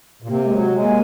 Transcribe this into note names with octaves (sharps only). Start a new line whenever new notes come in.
A#2
C3 A#3
G#3
F#3
G#3
A#3